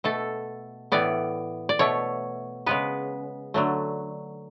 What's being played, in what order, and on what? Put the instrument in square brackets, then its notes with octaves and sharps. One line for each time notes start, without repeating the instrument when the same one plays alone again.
[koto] B2 A3 A4
A2 E3 B3 D5
D5
B2 A3 C#5
C#3 G#3 B3 B4
D3 F#3 A3